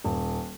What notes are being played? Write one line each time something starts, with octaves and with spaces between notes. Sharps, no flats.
D#1